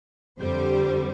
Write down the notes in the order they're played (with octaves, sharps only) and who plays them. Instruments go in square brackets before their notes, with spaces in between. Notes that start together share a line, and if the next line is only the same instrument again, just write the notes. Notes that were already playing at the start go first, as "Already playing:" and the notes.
[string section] F2 D3 G3 C5